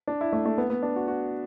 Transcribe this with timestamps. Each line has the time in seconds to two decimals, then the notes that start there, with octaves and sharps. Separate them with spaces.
0.07 D4
0.21 E4
0.33 A3
0.46 A3
0.58 B3
0.70 B3
0.83 D4
0.96 F#4
1.08 F#4